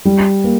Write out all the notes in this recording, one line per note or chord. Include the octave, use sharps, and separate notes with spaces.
G3
A#3